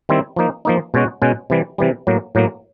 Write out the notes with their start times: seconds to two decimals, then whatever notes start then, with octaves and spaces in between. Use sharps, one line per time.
0.09 D#3 G3 C4 E4
0.36 F3 A#3 D#4
0.65 F3 A#3 D#4
0.94 B2 G#3 C#4 F#4
1.22 B2 G#3 C#4 F#4
1.50 C3 E3 G3
1.78 C3 E3 G3
2.07 A2 F#3 A#3
2.35 A2 F#3 A#3